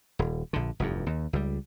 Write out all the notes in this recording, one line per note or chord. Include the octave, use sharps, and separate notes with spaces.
D#1
A#1 D3
F1 E2 G2
D#2
C#2 G3